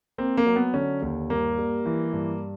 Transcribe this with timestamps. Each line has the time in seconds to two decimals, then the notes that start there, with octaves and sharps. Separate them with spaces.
0.18 A#3 C4
0.37 A#3
0.46 F#3
0.56 B3
0.74 D3 C#4
1.02 D#2
1.30 G2 A#3
1.58 G3
1.86 E3
2.13 G2